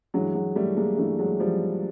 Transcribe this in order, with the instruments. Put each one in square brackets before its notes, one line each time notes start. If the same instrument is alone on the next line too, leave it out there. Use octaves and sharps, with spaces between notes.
[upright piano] G2 E3 F#3 G#3
F#3 G#3
G3 A3
G#3 A#3
G2 E3 G3 A3
F#3 G#3
F3 G3